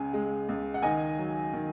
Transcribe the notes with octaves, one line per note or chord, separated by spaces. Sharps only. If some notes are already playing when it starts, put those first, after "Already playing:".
Already playing: C#2 C#3 G#5
G#3
C#2
F#5
D#3 D#5 G#5
F#3
D#3